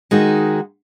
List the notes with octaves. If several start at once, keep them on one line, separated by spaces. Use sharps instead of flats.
D#3 G#3 D#4 F#4